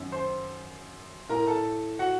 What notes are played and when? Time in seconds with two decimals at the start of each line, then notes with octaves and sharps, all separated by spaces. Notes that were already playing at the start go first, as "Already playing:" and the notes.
Already playing: F#2 D#3
0.12 C5 C6
1.29 A2 A#4 A#5
1.47 A4 A5
1.99 F#4 F#5